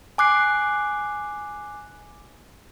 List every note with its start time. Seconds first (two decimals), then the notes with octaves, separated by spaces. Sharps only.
0.18 G#5 D6 F#6 C7